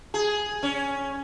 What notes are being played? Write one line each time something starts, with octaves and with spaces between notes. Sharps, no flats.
G#4
C#4